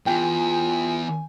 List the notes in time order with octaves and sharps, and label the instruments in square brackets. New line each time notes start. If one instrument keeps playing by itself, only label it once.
[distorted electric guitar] E2 [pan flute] F4 [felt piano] G5 [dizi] G#5